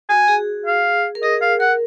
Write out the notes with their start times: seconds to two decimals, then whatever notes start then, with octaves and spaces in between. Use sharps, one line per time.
0.09 F#4 G#5
0.28 G#4
0.66 F5
1.15 A#4
1.23 G#4 D#5
1.42 F5
1.60 A#4 F#5